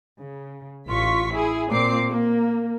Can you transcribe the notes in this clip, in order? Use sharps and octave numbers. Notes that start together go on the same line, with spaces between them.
C#3
A1 F4 C#6 B6
E4 G#4
A#2 C4 D6 C7
A#3